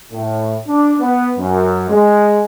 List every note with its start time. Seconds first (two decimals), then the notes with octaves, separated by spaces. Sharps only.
0.12 A2
0.67 D4
1.00 B3
1.37 F#2
1.89 G#3